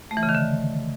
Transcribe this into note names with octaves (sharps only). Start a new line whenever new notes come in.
A3
E3
C#3
D#3
D3